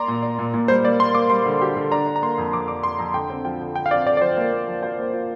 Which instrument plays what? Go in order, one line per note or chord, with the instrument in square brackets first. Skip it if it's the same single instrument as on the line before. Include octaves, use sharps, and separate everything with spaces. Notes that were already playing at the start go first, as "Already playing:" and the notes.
Already playing: [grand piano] A#3 D5 [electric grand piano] A#5 C6 D6
[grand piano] A#2
D5
A#2
A#2
[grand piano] G3 [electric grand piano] C5
[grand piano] A#3 [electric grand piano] D5
[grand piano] A#3 [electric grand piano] C6
[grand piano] A#3 [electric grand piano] D6
[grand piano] G3 [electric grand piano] C6
[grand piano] D3
G4
D3
[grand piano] D4 [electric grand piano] A#5
[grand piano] D4
[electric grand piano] A#5
[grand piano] A#3 [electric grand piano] C6
[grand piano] F2
[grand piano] F2 [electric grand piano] D6
[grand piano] D4 [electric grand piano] D6
[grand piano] F2 [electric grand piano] C6
[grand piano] F2 [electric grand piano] A#5
[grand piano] D3 [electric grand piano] G5
[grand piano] C4
[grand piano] F3 [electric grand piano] G5
[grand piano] D3
[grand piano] D3 [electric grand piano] G5
[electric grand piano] F5
[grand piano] C4 [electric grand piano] D5
[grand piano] D3 [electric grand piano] D5
[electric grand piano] D5
[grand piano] F3 [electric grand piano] C5
[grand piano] A#3
A#3
F3
C5
A#3
F4